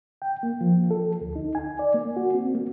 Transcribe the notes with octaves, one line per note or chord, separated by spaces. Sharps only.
G5
A#3
F3
A4
D2
D#4
G#5
D5
A#3
F#4
C4
A#3